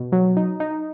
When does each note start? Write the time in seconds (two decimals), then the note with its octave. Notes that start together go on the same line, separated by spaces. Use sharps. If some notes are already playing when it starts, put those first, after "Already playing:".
Already playing: B2
0.12 F#3
0.37 D#4
0.60 D#4